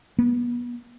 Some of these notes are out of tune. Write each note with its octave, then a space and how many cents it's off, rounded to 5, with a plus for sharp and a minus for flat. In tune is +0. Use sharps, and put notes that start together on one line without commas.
B3 -30